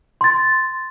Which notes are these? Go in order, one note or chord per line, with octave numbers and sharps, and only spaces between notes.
C6 A6